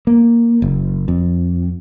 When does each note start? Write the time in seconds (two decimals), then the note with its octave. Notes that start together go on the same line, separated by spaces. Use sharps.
0.07 A#3
0.62 F#1
1.08 F2